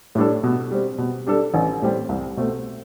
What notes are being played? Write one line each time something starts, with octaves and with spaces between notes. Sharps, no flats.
A2 G3 D4 A4
B2
G3 C4
B2
G3 D4 A4
A1
A2 G3 C4 G4
C2
B2 A3 C4